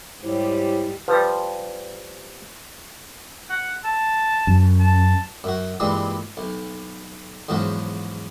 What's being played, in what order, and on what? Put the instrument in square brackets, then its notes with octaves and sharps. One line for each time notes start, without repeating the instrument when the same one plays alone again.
[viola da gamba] G#2 G3 G4 [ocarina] E4 [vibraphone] C5 C#5
[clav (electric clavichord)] F3 G3 [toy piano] B4 E6
[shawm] F#5
A5
[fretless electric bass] F#2
[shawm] A5
[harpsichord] F#2 F#4
G2 A#2 E3 G3 G#3
B1
E2 G#2 F3 F#3 C#4